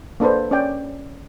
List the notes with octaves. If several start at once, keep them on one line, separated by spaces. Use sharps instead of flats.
A#3 D4 A4 B4 C5
C#4 D5 G5